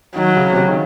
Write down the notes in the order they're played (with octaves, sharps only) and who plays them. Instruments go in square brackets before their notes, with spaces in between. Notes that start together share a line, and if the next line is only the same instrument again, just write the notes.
[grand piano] D#3 [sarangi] F#3
[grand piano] C#3
C3
C#3
D#3